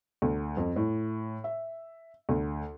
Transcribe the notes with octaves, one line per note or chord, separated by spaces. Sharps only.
D2
F2
A2
E5
D2